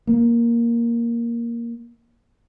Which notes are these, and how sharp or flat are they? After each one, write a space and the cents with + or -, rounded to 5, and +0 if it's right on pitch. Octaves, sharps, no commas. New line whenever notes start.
A#3 +5